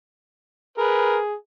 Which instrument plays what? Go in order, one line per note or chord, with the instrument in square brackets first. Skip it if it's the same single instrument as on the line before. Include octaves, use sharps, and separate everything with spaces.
[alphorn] G#4 [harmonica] A#4 B4